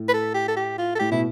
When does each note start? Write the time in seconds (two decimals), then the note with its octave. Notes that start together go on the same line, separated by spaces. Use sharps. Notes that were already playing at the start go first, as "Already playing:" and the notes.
Already playing: A2
0.09 B4
0.14 A4
0.34 G4
0.48 A4
0.57 G4
0.78 F4
0.95 A4
0.99 A2 G4
1.12 B2 E4